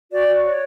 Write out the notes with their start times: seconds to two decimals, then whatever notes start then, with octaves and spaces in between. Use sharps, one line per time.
0.11 F#4 D5
0.28 F#4
0.44 C#5